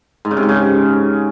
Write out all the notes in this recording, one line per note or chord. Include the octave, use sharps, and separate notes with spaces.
G#2
C#3
C3
G#2
C#3